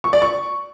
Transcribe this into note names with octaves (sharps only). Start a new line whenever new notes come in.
C#6
D5
C#6